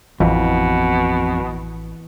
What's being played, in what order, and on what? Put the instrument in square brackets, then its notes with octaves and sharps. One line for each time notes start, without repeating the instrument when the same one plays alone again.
[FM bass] A1 [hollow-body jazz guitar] F2 [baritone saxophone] B2 [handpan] E3